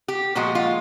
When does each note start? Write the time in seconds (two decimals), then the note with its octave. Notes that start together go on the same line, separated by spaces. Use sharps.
0.08 G4
0.35 A#2 F3 G#3 F#4
0.55 F4